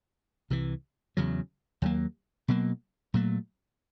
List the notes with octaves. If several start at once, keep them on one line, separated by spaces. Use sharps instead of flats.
C2 C3 E3
E2 C#3 F#3
D#2 D3 F#3 A#3
B2 F#3 A#3
A#2 F#3 A3